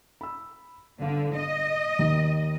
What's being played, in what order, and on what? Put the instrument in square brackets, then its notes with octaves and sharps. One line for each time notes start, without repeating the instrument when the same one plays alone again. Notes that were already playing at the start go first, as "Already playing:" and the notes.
[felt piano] B5 E6
[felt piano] G1 F5 [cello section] D3
[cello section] D#5
[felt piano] D#2 D#3